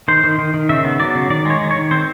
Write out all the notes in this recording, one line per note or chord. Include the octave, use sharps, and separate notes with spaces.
D#3 C5
D#3
D#3
D#3
C#3 E5
B3
F#3 D5
C#3
D#3 D5
G#3 C#5
D#3
C#5
D#3
C4 C5